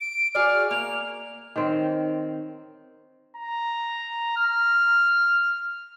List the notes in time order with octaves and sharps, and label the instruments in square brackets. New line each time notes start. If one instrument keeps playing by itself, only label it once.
[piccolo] D7
[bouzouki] F#4 G#4 D5 [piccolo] F6
[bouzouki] A#3 [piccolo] F7
[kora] D#3 C4 C#5
[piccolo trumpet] A#5
F6